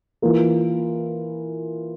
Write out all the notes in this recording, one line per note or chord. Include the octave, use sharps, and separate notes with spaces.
E3 A#3 F4 A#4